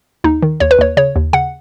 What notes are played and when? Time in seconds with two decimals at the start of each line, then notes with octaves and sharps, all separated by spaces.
0.24 D#2 D#4
0.42 D#3
0.60 D#2 C#5
0.71 B4
0.78 D#2 C#5
0.97 C#3 C#5
1.16 D#2
1.33 C#3 F#5